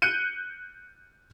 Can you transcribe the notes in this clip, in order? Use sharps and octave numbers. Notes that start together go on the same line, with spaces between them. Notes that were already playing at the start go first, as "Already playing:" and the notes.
F#6 G6 C#7 D#7